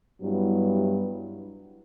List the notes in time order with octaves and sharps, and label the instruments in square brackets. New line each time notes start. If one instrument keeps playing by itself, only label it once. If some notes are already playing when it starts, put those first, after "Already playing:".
[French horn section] G2 F#3 B3 E4